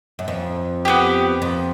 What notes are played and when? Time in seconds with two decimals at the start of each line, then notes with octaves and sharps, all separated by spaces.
0.19 F#2
0.28 F2
0.85 B3 D4 G4
1.42 F2